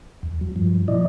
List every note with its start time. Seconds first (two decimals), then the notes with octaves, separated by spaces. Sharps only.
0.23 E2
0.41 F#3
0.56 G2 F3
0.88 A#2 F3 E4 D5 D#5